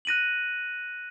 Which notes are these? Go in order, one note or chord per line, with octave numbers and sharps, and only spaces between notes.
F#6 A#6 D#7 F#7